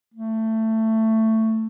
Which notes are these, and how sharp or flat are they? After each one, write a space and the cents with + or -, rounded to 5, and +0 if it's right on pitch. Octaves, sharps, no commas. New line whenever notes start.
A3 +15